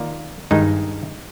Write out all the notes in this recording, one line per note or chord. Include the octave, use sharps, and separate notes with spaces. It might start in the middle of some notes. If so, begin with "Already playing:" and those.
Already playing: D#3 A#3 F4 A#4 D5
G2 D#3 G#3 D#4